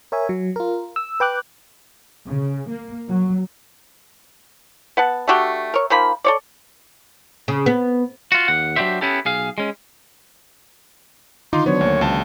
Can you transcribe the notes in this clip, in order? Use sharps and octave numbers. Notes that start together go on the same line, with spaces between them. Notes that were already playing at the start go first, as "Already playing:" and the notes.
A#4 C#5 E5 G#5
F#3
F4 A#4
E6
B4 G5 D6 F#6
C#3
A#3
F#3
B3 F#5 A5
A3 D4 F#4 G4
A#4 C#5
D#3 F3 A#3 B5
A4 C#5 D5
C#3
B3
F4 F#4
D#2 F#5
F#3 D4 F#4 G4 C5 E5
B3 C#4 E4 G4 A4
B1 G#4 F5
G#3 C#4
D3 D#3 D#4 F4 C6 D6
F#3 B3 D4 C5 C#5
D2 A#3
C#2 A5